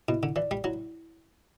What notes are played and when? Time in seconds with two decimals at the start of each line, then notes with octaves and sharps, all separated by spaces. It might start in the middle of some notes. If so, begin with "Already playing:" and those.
0.08 B2 E4
0.23 D3
0.36 E3 D5
0.51 G3
0.64 F#3 E4